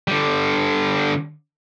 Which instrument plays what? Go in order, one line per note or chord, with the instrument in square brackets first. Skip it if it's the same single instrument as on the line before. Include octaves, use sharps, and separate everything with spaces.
[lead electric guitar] D3 G3